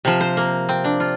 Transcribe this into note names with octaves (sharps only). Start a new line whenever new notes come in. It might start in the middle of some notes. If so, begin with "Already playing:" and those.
C3 F3
C5
A#3
C4
D4
F4